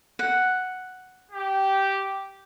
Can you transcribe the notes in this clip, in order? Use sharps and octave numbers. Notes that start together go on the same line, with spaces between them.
F#5
G4